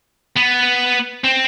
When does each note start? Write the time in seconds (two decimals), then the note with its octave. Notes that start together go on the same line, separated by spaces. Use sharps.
0.37 B3
1.24 C4